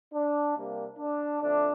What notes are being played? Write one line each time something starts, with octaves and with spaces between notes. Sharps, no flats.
D4
C3 G3 A#3
D4
F2 D3 A3 D4